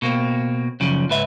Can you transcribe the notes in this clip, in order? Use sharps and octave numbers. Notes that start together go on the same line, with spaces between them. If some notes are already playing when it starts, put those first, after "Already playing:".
B2 A#3 C4
F#2 C#3 F3
C#2 G#2 B4 E5